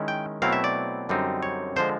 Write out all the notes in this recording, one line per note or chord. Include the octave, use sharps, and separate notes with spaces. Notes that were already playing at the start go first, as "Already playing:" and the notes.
Already playing: D#3 G#3 C#4 E4
G5
B2 F#3 A3 C4 E4 F5
E5
D5
F#2 D3 G3 C4 D#4
C#5
D3 F3 G#3 C5